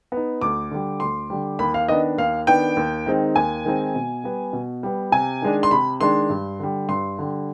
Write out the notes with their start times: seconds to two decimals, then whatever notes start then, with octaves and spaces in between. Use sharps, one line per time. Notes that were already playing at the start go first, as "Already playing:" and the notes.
0.12 B3 D#4
0.41 D2 D6
0.71 D3 G3
1.00 D2 C6
1.30 D3 G3
1.59 D#2 B5
1.74 F5
1.88 D#3 B3 D4 D#5
2.18 D#2 F5
2.47 D#3 B3 D4 G5
2.77 D#2
3.06 D#3 G#3 C4 D#4
3.36 D#2 G#5
3.65 D#3 G#3 C4 D#4
3.95 B2
4.24 G3 B3
4.53 B2
4.83 G3 B3
5.12 C3 G#5
5.42 D#3 G#3 D4
5.63 C6
5.71 C3 B5
6.00 D#3 G#3 D4 C6
6.30 G2
6.60 D3 G3
6.89 G2 C6
7.19 D3 G3